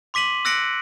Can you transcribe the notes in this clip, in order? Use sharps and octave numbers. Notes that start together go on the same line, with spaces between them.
C6 D6 B6 D#7 F#7
E6 F#6 A#6 C#7 D7 F#7